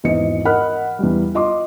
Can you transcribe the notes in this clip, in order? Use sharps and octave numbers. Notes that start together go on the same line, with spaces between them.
G#1 E2 D#5 C#7
A#4 D#5 F#5 B5 F6 F#6
E2 G3
F4 D#5 C6 D6